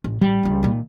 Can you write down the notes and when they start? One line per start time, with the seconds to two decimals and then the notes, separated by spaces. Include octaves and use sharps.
0.04 A1
0.21 A1 G3
0.43 C#2 F3
0.63 A#2 D#3